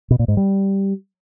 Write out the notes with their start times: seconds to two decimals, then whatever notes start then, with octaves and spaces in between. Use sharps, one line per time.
0.11 B2
0.19 A#2
0.28 G#2
0.37 G3